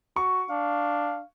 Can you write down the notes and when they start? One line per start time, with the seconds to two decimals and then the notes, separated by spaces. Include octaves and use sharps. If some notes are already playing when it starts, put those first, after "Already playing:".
0.16 F#4 C#6
0.50 D4 F5